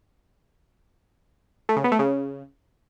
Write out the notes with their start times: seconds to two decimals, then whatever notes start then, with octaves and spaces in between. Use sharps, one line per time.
1.69 A3
1.76 C#3
1.84 B3
1.92 A3
1.99 C#3